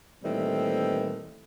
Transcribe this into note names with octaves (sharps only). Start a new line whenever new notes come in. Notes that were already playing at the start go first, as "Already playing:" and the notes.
A#2 D#3 E3 G3 A3 C4